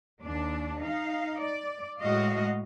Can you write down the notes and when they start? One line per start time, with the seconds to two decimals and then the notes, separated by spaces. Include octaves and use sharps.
0.22 D#2 D4
0.83 D#4 F5
1.40 D5
2.01 A2 G#3 F#4 D#5 F5